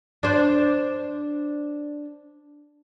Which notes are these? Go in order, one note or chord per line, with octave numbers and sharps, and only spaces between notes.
D4 C5